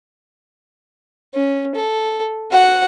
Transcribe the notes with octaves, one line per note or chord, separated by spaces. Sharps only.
C#4
A4
F#4 F#5